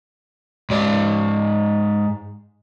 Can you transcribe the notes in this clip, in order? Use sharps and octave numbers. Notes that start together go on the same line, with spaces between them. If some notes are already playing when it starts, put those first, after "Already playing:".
G#2 D5